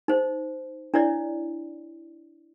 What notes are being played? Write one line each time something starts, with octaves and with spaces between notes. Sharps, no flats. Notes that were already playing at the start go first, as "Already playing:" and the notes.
D#4 C5
D4 E4 C#5 D5